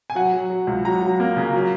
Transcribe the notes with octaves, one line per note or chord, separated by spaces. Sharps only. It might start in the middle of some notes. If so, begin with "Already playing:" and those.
G#5
F#3 F#5
F#3
F#3
C#2
F#3 A#5
F#3
A#3
C#3
F#3